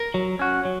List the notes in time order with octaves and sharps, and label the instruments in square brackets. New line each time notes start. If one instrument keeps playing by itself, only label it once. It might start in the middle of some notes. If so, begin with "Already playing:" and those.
Already playing: [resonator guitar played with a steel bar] A#4
[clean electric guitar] F#3
C#4 F#4
F#3